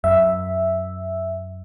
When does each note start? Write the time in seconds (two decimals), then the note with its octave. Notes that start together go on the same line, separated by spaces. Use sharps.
0.04 F#2 E5